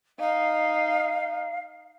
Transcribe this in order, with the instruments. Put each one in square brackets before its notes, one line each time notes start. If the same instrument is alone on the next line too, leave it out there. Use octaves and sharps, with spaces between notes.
[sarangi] D#4 [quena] F5